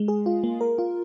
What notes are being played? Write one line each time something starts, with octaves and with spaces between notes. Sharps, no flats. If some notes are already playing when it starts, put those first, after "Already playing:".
Already playing: G#3
G#4
F4
A#3
A#4
F4